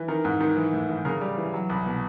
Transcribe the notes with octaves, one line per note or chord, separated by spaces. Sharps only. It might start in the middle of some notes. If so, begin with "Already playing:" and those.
Already playing: E3
D#3 A#4
G#2
D#3
E3
A2
E3
C#3 A#4
G3
E3
F#3
C2
B2